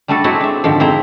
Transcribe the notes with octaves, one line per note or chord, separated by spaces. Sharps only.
G3 A3 D4 F#4 A4
F#3 G#3 A3 C4 E4 F#4
D4 E5
G#2 D3 D#3 F3
F2 C4 E4 C5 A#5